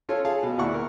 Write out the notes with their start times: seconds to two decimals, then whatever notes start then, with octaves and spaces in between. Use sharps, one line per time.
0.09 C#4 F4 A4 C#5
0.25 G#4 F5 A5
0.43 B2
0.57 D2 A#2 E4 F#5 C#6 F#6
0.74 A#4